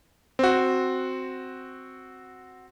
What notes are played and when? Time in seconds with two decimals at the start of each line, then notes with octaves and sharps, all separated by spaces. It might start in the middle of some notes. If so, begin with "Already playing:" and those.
0.39 C4 F#4